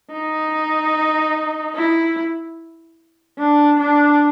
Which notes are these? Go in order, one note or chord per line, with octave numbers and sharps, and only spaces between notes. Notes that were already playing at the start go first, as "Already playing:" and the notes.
D#4
E4
D4
D4